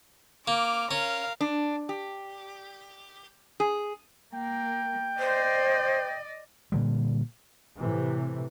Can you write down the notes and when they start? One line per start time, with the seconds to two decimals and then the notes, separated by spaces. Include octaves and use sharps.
0.48 A#3 D6 F6
0.91 C#4 A#4 F5
1.41 D4
1.89 G4
3.60 G#4
4.34 A#3 G5
5.19 C5 D5 D#5
6.72 A#2 D3 G3
7.77 A2 C3 E3